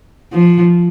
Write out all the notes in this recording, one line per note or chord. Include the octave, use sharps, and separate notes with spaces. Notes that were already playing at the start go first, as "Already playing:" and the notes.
F3